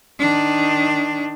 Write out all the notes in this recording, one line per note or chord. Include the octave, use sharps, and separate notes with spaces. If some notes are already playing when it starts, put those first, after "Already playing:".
D#3 D4